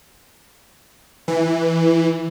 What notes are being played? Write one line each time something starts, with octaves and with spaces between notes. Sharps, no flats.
E3